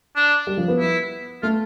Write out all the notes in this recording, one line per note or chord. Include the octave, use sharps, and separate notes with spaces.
D4
G3
F3
B3
E4
A3 F4